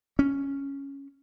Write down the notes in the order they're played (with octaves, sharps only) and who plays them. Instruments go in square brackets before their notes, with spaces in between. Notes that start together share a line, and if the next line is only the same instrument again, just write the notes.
[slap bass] C#4